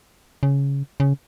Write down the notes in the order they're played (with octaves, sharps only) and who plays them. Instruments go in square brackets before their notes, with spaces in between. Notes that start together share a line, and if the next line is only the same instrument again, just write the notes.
[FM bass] C#3
C#3